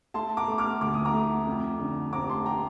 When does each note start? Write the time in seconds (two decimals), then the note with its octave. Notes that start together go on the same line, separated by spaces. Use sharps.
0.14 A3 A5 C6
0.37 A#5 D6
0.48 A3
0.58 D6 F6
0.81 D2 D6
0.94 D#6
1.05 A#5 D6
1.13 A3
1.47 F2
1.79 D3
2.13 F1 A#5 D6
2.28 A5 C6
2.45 G5 A#5